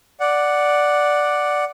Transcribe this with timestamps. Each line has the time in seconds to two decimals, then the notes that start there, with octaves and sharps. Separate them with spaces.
0.20 D5 F#5